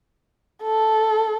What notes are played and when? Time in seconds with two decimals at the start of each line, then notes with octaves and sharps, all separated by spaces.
0.62 A4